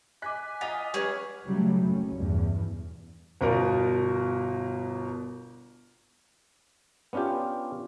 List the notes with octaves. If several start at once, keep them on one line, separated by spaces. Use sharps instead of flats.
D#5 G#5 D6 F#6 B6
F4 D#5 F#5 D6 B6 F7
G3 C#4 G#4 B4 C#5
C#3 F#3 G3 A3
F#1 C#4
E2 G2 B2
G1 B2 A#4 D5
B3 C#4 D4 F4 G4